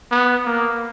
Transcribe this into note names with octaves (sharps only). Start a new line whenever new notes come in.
B3
A#3